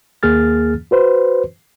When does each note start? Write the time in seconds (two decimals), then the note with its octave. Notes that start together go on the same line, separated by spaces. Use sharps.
0.23 D#2 A#3 G#4 F6 A6
0.91 F#4 B4 C5